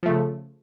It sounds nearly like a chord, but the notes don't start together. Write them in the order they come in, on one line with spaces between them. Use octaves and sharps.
F3 A3 C#3